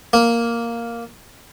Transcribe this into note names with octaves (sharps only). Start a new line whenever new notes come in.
A#3